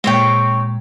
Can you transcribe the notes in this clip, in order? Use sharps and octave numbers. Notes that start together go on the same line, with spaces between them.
A#2 G#3 C4 C#5 G5